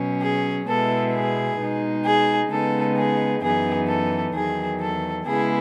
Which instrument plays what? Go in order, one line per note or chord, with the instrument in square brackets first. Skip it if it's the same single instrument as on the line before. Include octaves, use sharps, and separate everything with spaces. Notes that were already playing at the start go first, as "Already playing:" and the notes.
Already playing: [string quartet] B2 F#3 C#4
G#4
B2 G#3 B3 E4 A4
G#4
B2 G#3 D#4
G#4
C#3 G#3 B3 D#4 A4
G#4
F#2 E3 B3 D#4 G#4
A4
E2 D#3 F#3 G#4
A4
C#3 G#3 B3 E4 G#4